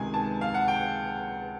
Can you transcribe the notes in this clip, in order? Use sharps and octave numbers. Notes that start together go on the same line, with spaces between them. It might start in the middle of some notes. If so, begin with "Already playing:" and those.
Already playing: C#2 C3 D#3 G#3 G#5
A5
F5
F#5
G5